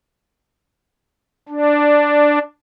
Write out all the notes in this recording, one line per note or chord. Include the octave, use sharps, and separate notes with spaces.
D4